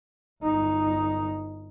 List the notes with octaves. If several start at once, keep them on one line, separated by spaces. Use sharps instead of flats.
G1 D#4